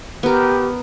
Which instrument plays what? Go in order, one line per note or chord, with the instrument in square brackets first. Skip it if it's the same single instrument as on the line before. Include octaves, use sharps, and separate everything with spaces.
[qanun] B3 A#4 [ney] G4